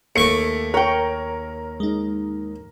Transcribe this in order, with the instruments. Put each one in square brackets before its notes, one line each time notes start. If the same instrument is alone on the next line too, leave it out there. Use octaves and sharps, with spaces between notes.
[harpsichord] D#2 C#6 D6 [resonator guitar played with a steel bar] A3 [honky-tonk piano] C#7
[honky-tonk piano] A#4 [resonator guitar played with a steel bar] C#5 G5
[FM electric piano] G#3 D#4